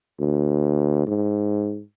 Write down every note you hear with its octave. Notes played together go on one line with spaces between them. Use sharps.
D2
G#2